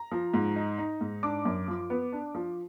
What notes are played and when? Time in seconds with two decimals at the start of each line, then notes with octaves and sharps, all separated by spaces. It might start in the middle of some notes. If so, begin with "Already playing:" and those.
Already playing: A#5
0.12 F3
0.34 G#2
0.56 D#4
0.78 D#4
1.01 G#2
1.23 D4 D6
1.45 F#2
1.68 F3
1.90 B3
2.13 D4
2.35 F3